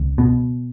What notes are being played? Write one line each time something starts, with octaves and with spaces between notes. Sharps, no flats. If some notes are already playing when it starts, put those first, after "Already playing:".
Already playing: C#2
B2